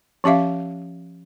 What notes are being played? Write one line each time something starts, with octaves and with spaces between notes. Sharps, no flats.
F3 C#4 G4 E5 F5